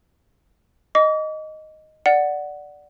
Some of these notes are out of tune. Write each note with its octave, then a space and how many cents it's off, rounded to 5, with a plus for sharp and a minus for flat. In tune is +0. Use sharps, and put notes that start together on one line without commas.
D#5 +0 D6 -40
D5 +0 F#5 +0